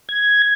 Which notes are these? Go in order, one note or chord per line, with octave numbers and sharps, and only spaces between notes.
G#6